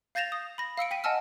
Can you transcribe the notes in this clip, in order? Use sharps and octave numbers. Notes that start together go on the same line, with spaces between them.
F5 G6 A6 A#6 E7 F7
D#6
B5 A#6
F5 E6 C#7 D7
G5 B6 D#7
D#5 F#5 G#5 A5 E6 F6